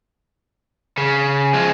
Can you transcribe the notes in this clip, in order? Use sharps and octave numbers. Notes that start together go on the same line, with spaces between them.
C#3
F3 G#3